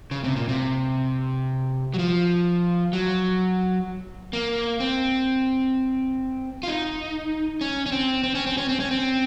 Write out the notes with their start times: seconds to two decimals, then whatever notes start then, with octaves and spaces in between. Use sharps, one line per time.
0.11 C#3
0.24 C3
0.36 A#2
0.49 C3
1.94 F#3
1.99 F3
2.93 F#3
4.33 A#3
4.80 C4
6.63 F4
6.67 D#4
7.61 C#4
7.86 C#4
7.92 C4
8.23 C4
8.35 C#4
8.47 C4
8.57 C#4
8.69 C4
8.80 C#4
8.91 C4